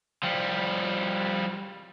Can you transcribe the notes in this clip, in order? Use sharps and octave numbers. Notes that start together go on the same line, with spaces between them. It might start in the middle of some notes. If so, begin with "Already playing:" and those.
F3 G3